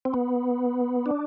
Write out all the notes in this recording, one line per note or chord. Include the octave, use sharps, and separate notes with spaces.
C4
B3
D4